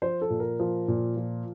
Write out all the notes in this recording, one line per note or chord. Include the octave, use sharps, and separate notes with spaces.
F3 C5
A4
A#2
A#4
F3
A#2
F3